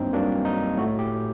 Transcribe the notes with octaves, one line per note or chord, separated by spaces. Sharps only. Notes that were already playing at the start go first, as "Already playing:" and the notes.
Already playing: G2 F#3 A#3 C4 D4 D#4
G2 F#3 A#3 D4
D#4
A2 A3 F#4
G4